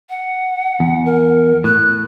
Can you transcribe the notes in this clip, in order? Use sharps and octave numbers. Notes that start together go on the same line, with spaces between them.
F#5
E2
A#4
A2 F#6